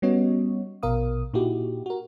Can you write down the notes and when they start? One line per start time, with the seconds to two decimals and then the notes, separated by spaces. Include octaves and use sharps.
0.02 G3 B3 C#4 F#4 C#5 D#5
0.83 A#1 B2 A#4 F5 D#6
1.34 A#2 D#4 E4 F#4 G4
1.86 F#4 A#4